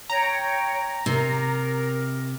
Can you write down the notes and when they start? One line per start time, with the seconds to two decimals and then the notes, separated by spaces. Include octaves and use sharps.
0.10 C#5 G5 A#5
1.06 C3 A#4